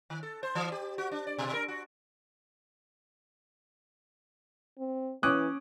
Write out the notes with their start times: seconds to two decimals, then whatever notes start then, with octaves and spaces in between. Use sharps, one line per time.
0.10 D#3
0.23 A4
0.43 C5
0.55 E3
0.72 G4
0.98 F#4
1.11 D4
1.27 D5
1.38 B2
1.54 A#4
1.68 F#4
4.79 C4
5.23 E3 C#4 D6 D#6 F#6